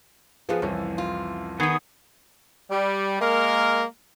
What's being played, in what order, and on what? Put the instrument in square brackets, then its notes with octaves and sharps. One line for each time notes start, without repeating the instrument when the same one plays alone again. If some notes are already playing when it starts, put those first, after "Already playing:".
[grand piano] F3 [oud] B3 F4 G#4
[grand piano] C2 F2 E3 [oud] C#4
[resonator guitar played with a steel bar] F4
[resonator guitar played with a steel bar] D#3 D#4 [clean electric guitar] B3 G#4
[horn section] G3
G#3 A#3 A#4